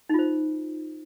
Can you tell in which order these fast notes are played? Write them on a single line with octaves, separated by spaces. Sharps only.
D#4 F4 C5